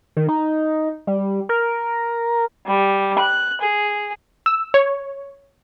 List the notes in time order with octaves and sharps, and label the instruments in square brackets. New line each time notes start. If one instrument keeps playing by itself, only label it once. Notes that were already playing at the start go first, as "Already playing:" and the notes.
[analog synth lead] D#3
D#4
G3
A#4
[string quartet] G3
F#6
G#4
[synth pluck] E6
C#5